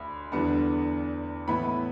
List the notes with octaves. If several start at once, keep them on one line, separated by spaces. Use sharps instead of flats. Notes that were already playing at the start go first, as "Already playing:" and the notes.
Already playing: D2 B5
E2 D3 G3 B3 D4
A2 E3 B3 E4 B5